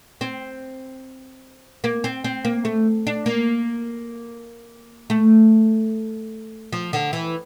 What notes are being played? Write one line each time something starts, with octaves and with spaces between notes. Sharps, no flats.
C4
A#3
C4
C4
A#3
A3
D4
A#3
A3
F3
D3
E3